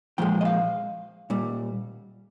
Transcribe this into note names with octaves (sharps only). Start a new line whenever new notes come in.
A#2 F3 G#3 G5
D#5
F5
A#2 G3